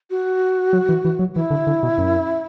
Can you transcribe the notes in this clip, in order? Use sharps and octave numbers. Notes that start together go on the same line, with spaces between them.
F#4
F#3
E3
E3
F#3
E3 E4
D3
D3
B2
F#2